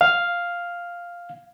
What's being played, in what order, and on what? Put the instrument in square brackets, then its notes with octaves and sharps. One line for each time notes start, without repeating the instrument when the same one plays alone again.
[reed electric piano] F5